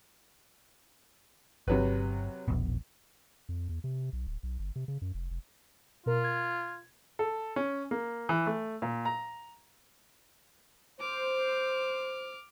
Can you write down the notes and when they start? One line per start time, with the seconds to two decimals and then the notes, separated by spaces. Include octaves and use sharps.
1.68 G1 C3 F#3 B4
2.48 E1 A#1 B2
3.49 F2
3.69 E2
3.84 C3
4.13 B1
4.27 D1
4.43 B1
4.59 G1
4.76 C3
4.88 C#3
5.02 F#2
5.14 F1
5.30 F1
6.06 B2 F4 A#4
6.24 G#6
7.19 A4
7.56 C#4
7.91 A#3
8.29 E3
8.47 A3
8.82 A#2
9.05 A#5
11.00 C5 D6 F6